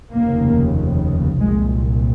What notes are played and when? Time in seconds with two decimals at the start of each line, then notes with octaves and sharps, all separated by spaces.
0.13 F1 D#2 C#3 A#3
1.39 C2 A#2 G#3